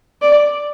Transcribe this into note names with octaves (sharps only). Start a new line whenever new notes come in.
D5